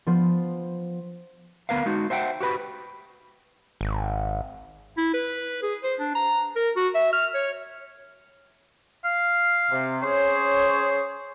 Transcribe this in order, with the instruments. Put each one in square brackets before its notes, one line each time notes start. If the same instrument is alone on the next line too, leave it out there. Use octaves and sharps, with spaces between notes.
[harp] F3 B3 C5
[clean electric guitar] D2 B3 A#4 B4 F5
G#3 D#4 F#4
C5 E5 F#5 G5
F#4 G4 B4 B5
[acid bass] G#1
[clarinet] E4
B4
G#4
C5
D4
A#5
A#4
F#4
E5
F6
C#5
[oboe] F5
[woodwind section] C3
[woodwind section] C#4 G#4 C#5 [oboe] C5